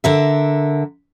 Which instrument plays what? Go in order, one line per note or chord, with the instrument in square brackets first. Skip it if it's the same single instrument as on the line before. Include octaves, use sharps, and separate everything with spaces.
[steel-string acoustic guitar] D3 A#4 E5